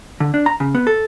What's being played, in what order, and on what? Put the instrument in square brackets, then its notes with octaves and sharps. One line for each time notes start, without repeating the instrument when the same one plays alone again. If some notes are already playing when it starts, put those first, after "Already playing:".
[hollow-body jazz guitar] D3
D4
A#5
C#3
B3
A4